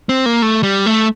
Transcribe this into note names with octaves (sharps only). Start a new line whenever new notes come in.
C4
A#3
A3
G3
A3